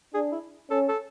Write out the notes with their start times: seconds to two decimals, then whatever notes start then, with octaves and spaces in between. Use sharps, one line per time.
0.14 D4 G#4
0.32 E4
0.70 C#4 A4
0.88 A4